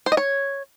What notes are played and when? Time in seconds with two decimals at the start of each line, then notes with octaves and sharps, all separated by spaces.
0.06 C5
0.12 D#5
0.17 C#5